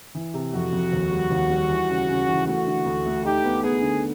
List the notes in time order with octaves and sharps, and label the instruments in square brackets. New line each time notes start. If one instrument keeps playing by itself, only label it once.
[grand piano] E3
C3
[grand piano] F2 [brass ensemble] F#4
[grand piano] F2
D#2
G3
D#2
G3
E3
C#3
C#3
E3
[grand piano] A3 [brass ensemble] F#4
[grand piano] D3
D2
A3
[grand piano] D#4 [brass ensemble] G4
[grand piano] B3
[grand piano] B3 [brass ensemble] G#4
[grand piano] D3